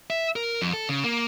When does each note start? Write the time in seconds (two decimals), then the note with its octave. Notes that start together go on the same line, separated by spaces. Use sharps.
0.10 E5
0.36 A#4
0.62 F2
0.73 A4
0.89 C#3
1.04 A#3